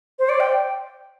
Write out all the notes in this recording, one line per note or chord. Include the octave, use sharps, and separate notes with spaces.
C5
D5
G5